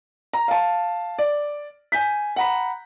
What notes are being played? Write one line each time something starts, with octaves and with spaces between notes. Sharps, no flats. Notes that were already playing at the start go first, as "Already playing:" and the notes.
A#5
F5 A5
D5
G#5 G6 B6
F#5 A#5 B5